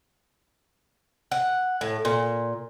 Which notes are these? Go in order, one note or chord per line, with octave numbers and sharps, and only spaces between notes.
F#5
A2
A#2